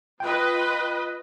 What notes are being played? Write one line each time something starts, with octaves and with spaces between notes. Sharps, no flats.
F4 B4 D#5 G5